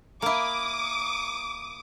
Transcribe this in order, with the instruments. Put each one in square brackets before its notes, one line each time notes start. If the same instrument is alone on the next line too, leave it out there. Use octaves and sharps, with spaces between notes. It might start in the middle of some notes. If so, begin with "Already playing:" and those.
[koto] A#3 E4 [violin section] D6 D#6